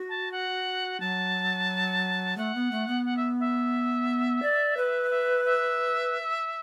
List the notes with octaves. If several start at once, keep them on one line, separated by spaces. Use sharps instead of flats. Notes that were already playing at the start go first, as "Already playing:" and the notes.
Already playing: F#4
A5
F#5
F#3 A5
A3 F#5
B3
A3
B3
F#5
E5
E5
D5
B4
E5
E5